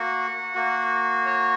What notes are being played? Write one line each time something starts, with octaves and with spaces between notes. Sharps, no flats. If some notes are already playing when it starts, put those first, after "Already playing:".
Already playing: A#3 F#4 F#5
A#3 F#4
C#5